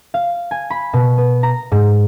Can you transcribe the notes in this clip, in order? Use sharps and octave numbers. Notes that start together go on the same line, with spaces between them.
F5
G#5
B5
B2
B3
A#5
G#2